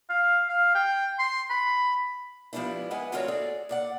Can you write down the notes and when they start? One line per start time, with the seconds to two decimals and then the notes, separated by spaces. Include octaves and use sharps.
0.09 F5
0.49 F5
0.75 G5
1.19 C6
1.50 B5
2.53 F3 G3 G#3 B3 D4 E4
2.91 E4 G#4 B4 D#5 F#5 G#5
3.12 D2 C4 F4 F#4 A#4 C#5
3.28 G#4 A4 D5 F#5
3.69 A#2 D5 F#5